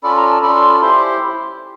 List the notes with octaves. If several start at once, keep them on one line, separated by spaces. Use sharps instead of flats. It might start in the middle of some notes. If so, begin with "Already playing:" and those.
C#4 F4 A4 D5 B5
A#5
A5
C#4 F4 A4 D5 B5
C6
B5
E4 G4 C5 C6